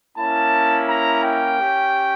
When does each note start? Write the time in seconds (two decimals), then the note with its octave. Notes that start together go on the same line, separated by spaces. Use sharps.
0.17 A#3 C#4 E4 A5
0.89 A#5
1.24 G5
1.60 C#4 G4